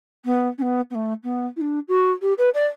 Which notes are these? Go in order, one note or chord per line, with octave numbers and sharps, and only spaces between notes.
B3
C#4
B3
B3
A3
B3
E4
D4
F#4
G4
B4
D5